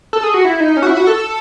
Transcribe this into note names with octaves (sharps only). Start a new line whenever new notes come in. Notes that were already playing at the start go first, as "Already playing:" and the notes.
A4
G#4
F#4
E4
D#4
C#4
F#4
E4
F#4
A4